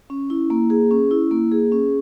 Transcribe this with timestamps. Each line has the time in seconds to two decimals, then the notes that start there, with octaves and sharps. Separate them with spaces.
0.10 C#4
0.30 E4
0.50 A#3
0.70 G#4
0.91 C#4
1.11 E4
1.31 A#3
1.52 G#4
1.72 C#4